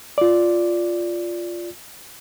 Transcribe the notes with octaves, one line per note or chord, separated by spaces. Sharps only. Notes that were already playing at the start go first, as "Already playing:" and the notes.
F4 D5